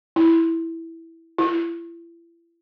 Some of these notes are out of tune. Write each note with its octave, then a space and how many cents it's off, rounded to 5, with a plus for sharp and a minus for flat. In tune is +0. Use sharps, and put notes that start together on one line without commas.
E4 -5
E4 +35